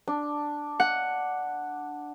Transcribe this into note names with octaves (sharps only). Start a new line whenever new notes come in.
D4
F#5